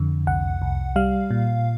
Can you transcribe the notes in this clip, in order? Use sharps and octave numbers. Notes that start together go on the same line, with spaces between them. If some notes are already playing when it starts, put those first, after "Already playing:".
Already playing: F2 D3
C2 F#5
C2
G3 F5
A#2